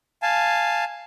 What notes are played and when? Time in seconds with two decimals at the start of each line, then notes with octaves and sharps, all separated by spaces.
0.22 F5 G#5 A5